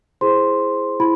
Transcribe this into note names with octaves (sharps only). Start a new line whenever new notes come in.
E4 G#4 C5 C6
E4 B5